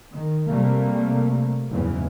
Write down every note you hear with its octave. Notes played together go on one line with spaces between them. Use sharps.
D#3
C3 G3 A3 A#3
F#1 E2 G#2 C#3 E3